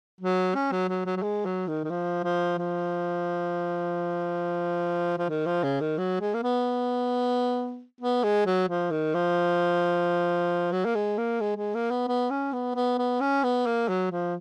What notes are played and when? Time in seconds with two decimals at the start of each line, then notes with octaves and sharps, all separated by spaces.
0.21 F#3
0.55 C#4
0.72 F#3
0.88 F#3
1.06 F#3
1.17 F#3
1.22 G#3
1.45 F#3
1.68 D#3
1.84 D#3
1.90 F3
2.24 F3
2.58 F3
5.18 F3
5.29 D#3
5.46 F3
5.63 C#3
5.81 D#3
5.98 F#3
6.21 G#3
6.34 A#3
6.43 B3
8.01 B3
8.24 G#3
8.46 F#3
8.69 F3
8.91 D#3
9.14 F3
10.72 F#3
10.85 A#3
10.95 G#3
11.18 A#3
11.40 G#3
11.57 G#3
11.74 A#3
11.91 B3
12.08 B3
12.30 C#4
12.53 B3
12.75 B3
12.98 B3
13.21 C#4
13.44 B3
13.66 A#3
13.89 F#3
14.11 F3